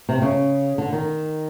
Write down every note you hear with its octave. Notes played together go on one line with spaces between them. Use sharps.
C3
C#3
D3
D#3